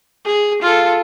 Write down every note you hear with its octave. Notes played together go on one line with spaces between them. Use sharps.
G#4
F4 A4